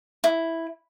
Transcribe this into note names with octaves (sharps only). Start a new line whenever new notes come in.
E4